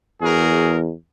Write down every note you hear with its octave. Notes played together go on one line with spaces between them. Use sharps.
E2 F#4 G#4 A#4